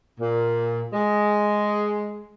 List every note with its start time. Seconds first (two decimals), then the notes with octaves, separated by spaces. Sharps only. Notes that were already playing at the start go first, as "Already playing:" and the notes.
0.19 A#2
0.93 G#3